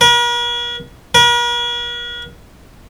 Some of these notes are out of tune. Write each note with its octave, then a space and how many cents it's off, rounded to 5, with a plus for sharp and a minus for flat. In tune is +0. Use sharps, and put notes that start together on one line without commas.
A#4 +45
A#4 +45